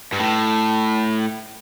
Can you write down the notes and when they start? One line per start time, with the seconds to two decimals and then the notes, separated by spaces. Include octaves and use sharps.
0.12 G2
0.19 A2